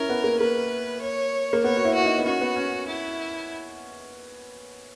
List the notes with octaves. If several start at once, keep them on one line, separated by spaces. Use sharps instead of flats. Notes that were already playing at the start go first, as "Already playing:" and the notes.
Already playing: C#4 E4 A#4
B3
A#3
A#3 B4
C#5
A#3
B3 C#5
F#4
E4
F#4
D#4
B3
C#4 F#4
B3
C#4
E4